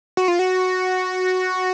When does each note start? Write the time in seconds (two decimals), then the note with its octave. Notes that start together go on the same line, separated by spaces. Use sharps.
0.17 F#4
0.28 F4
0.39 F#4